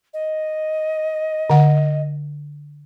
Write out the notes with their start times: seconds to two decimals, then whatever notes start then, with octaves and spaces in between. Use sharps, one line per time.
0.14 D#5
1.50 D3 F#5